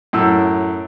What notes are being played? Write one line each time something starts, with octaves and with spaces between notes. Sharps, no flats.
F#2 A2 E6